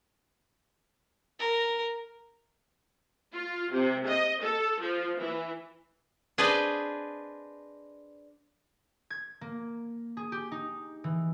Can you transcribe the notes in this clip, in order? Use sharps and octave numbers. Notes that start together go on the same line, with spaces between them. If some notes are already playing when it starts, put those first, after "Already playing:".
A#4
F4
C3
D#5
A4
F3
E3
D4 G#4 B4 C5 D5 D#5
G#6
A#3
G#4
G4
D#4
E3